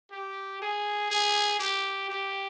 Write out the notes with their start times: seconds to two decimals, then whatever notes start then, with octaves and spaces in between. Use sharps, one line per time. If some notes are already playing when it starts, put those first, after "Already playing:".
0.11 G4
0.62 G#4
1.11 G#4
1.59 G4
2.09 G4